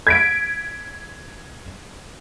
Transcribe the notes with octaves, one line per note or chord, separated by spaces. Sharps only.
G#6 B6 D7